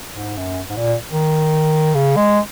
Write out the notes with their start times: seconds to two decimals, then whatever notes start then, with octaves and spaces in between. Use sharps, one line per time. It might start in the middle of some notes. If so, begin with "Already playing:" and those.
0.15 G#2
0.37 F#2
0.70 G#2
0.77 A#2
1.10 D#3
1.95 C#3
2.16 G#3